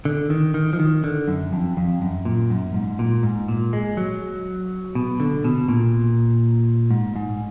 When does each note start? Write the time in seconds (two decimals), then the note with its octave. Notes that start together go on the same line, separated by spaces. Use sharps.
0.05 D3
0.30 D#3
0.54 D#3
0.73 F3
0.80 D#3
1.04 D3
1.28 F#2
1.53 F2
1.77 F2
2.02 F#2
2.25 A#2
2.50 F#2
2.74 G#2
2.99 A#2
3.23 G#2
3.48 A#2
3.73 G#3
3.97 F#3
4.95 B2
5.20 D3
5.44 B2
5.68 A#2
6.91 G#2
7.16 G#2